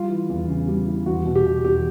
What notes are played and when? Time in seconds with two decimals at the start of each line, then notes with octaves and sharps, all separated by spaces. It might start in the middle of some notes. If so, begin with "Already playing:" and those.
Already playing: G3 F4
0.09 E3
0.29 E2
0.48 C#3
0.68 G3
0.87 E3
1.06 E2 F#4
1.26 B2
1.35 G4
1.44 B2
1.65 E2 G4